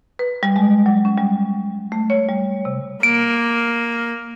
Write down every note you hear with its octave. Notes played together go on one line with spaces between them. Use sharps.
B4
G3
G#3
F#3
C#4
G3
A3
C#5
G3
C3
A#3 D7